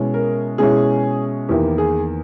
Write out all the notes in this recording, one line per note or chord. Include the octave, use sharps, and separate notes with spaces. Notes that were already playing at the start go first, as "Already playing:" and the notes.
Already playing: B2 G#3 C#4 E4
A#4
B2 G#3 C#4 E4 G#4
E2 D#3 A#3 E4 G4
G#4